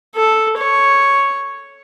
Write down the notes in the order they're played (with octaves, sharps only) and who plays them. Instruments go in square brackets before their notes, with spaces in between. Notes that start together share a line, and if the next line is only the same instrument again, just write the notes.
[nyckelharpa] A4
C#5